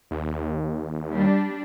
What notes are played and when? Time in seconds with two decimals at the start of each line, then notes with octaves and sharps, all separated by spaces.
0.11 D#2
1.13 G3 D4